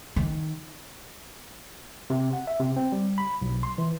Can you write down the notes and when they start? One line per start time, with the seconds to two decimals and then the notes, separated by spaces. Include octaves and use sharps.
0.16 D#3
2.10 C3
2.33 F#5
2.47 E5
2.60 C3
2.76 C4
2.92 G3
3.18 B5
3.41 B1
3.63 C6
3.78 E3